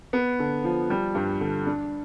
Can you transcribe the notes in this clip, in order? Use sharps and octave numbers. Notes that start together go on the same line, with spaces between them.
B3
D3
F3
G3
G2
D3
D4